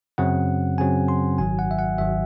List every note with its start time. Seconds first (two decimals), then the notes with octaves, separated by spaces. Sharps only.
0.18 F#2 C#3 F#3 C4 F#5
0.78 F#2 C#3 F#3 C4 G#5
1.08 C6
1.38 G#1 G#2 D#3 F#3 G#5
1.59 F#5
1.71 E5
1.79 F#5
1.98 G#1 G#2 D#3 F#3 E5